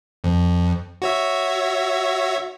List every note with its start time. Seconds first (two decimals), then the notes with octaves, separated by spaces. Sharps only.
0.24 F2
1.02 F#4 C#5 E5